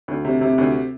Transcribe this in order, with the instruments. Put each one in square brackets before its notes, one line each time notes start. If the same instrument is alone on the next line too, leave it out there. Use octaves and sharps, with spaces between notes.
[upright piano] D2
C3
C3
D2